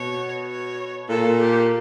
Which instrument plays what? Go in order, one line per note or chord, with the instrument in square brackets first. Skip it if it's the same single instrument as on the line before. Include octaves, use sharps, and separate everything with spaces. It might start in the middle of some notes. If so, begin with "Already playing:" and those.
Already playing: [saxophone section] B2 [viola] C#5
[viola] C#5
[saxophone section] A#2 [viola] A4
[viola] G4